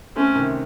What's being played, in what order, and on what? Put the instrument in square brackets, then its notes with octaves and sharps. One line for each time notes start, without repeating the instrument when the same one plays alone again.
[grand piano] A3 C4 [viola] C#4
[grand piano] C3 D#3